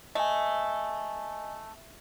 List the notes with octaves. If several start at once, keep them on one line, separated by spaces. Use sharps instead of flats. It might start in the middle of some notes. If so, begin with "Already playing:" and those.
A3 D#5 G#5